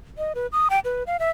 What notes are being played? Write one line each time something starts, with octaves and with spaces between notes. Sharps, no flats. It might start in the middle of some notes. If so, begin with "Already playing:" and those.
D#5
B4
D#6
G5
B4
F5
E5